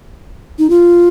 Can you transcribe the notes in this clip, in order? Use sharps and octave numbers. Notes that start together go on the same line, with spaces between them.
D#4
F4